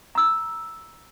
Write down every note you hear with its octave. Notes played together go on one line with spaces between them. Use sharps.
A#5 E6